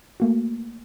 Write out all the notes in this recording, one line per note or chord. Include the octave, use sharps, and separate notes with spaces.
A3 A#3 F#4